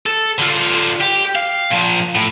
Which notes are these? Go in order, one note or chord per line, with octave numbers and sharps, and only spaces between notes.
A4
D3 F4
G4
F5
A#2 F3
A2